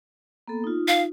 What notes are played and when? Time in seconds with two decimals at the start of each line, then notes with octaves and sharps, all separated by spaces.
0.48 A#3 B3 A4
0.64 D#4 F4
0.88 F5